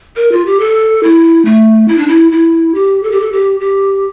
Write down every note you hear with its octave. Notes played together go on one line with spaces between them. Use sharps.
A#4
F4
G4
A4
E4
A3
E4
D4
E4
E4
G4
A4
G4
A4
G4
G4